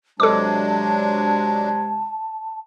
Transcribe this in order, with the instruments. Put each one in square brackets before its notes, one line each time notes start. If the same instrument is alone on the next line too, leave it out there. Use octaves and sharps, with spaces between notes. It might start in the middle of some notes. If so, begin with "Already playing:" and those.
[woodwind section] C3 G#3 [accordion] F#3 D4 [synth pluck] A4 D6 [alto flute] A5